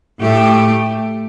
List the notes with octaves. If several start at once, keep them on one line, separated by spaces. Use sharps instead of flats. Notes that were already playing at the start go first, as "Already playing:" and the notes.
A2 A3 G4